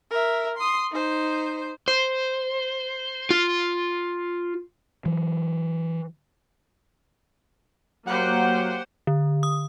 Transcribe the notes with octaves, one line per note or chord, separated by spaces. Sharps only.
A#4 E5
C6 D#6
D#4 C5
C5
F4
E3 F#3
F#3 A#3 G4 C5 F#5
D3
D#6